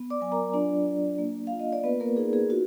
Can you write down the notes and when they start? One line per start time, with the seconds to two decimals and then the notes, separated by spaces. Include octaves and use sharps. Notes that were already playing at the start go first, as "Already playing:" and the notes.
Already playing: B3
0.10 D5 D6
0.21 F#3 G#5
0.32 A#4 A#5
0.53 D4 F4 D5
0.86 D4
1.18 A#3
1.47 F4 F5
1.59 D#5
1.73 D5
1.84 B3 B4
2.00 A#3 A#4
2.16 D#4 G#4
2.33 G#4
2.49 F4 F#4